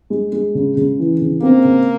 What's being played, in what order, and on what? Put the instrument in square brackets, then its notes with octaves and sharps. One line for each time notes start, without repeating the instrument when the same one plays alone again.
[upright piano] G#3
G#3
C#3
C#3
E3
C#3
[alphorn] A#3 [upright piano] C4
[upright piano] C#3